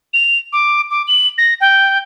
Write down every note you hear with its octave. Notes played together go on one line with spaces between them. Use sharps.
F7
D6
D6
F#7
A#6
G5